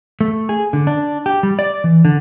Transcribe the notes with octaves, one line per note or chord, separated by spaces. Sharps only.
A3
G#4
D3
D4
G4
G3
D5
E3
D3